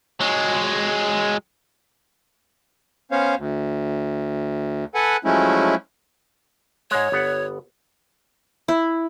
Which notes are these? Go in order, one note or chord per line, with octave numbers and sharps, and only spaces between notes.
F#3 G#3
B3 C#4 C5 C#5 F5
D2
A4 B4 F#5 G#5
F3 F#3 G#3 A3 C#4 E4
G#2 G#3 C#5
G1 B3 F#5
E4